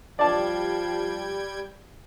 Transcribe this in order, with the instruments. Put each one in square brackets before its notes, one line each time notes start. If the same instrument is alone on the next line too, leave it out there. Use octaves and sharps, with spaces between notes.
[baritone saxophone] F3 [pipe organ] G3 G5 G#6 [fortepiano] D5 A5